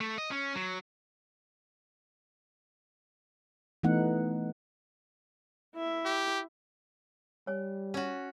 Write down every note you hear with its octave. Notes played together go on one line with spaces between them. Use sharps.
A3
D#5
C#4
F#3
E3 A3 B3 D#4 F#5
E4 E5
G4
G3 C#5 G#5
C#4 F#4